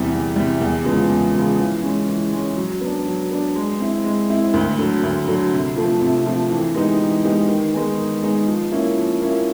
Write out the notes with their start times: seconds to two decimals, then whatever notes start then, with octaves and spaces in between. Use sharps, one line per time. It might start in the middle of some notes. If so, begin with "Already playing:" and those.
Already playing: E2 C3 E3 G3
0.12 E2
0.36 C3 E3 G3
0.61 E2
0.85 C#3 F3 G#3 B3
1.09 E2
1.34 C#3 F3 G#3 B3
1.59 E3
1.83 G#3 C#4
2.08 E3
2.33 G#3 C#4
2.57 F#3
2.81 B3 D4
3.06 F#3
3.31 B3 D4
3.56 G#3
3.80 C4 E4
4.04 G#3
4.30 C4 E4
4.54 D2
4.79 D3 F#3
5.03 D2
5.28 D3 F#3
5.52 C3
5.76 F3 A3 C4
6.01 C3
6.26 F3 A3 C4
6.50 E3
6.75 G#3 B3 D#4 G4
7.00 E3
7.24 G#3 B3 D#4 G4
7.49 D#3
7.74 G#3 B3 D#4 G#4
7.98 D#3
8.23 G#3 B3 D#4 G#4
8.47 F3
8.72 A#3 C#4 E4
8.97 F3
9.21 A#3 C#4 E4